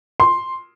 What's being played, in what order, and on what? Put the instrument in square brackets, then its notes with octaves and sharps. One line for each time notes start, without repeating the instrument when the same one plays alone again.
[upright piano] C6